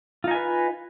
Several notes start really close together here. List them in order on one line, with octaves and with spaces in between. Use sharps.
F4 D#4 G#5 B4